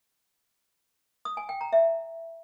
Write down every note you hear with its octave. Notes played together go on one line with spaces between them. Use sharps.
D#6
G#5
G5
A#5
E5